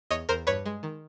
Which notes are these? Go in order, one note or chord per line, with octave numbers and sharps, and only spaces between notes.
E2 C#5 D#5
E2 A#4 C5
G2 B4 C#5
G#3
D#3